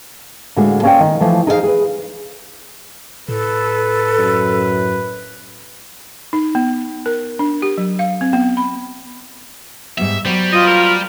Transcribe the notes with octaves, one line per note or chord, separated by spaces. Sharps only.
A2 D3 G#3 A#3 F#4
A#3 C#4 C5 D5 D#5 G5
D#3
E3 F3 A3
D#4 G#4 A#4 C5 C#5 F5
G#4 B4
A2 A4 B4
F#2
D#4
B3
A#4
D4
G4
F#3
F5
C4
B3
B5
G#2 G3 B3 E5
F#3 G3 B3 C5
F4 D#5
A#4